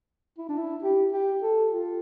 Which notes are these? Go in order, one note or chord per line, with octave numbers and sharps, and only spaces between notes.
E4
D4
E4
G4
G4
A4
F4